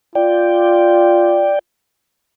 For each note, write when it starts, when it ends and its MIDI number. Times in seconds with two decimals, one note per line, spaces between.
0.15 1.53 65
0.15 1.59 74
0.15 1.59 79